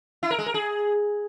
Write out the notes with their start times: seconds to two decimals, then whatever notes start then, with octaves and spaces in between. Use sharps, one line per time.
0.23 E4
0.31 A#4
0.38 G#3
0.46 A#4
0.54 G#4